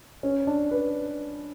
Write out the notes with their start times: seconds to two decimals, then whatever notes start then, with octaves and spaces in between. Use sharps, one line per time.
0.23 C#4
0.47 D4
0.71 B4